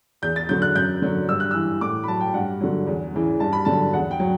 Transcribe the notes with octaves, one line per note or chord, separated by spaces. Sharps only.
E2 G6
A6
D3 F#3 G6
F#6
F#2 G6
D3 F#3
G2 E6
F#6
E3 E6
A2 D6
B5
F#3 A5
G5
G2 F#5
D3 F#3
E2
C#3 E3
G2 A5
B5
D3 F#3 A5
E2 F#5
G5
F#3